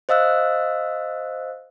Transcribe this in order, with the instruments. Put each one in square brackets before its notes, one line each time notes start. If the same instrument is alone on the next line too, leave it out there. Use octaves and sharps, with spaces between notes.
[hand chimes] C5 D#5 F5 E6 F#6